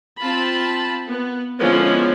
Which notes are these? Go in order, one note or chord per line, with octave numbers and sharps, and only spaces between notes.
C4 F4 A5 B5
B3
D3 F3 G#3 B3 C#4 E4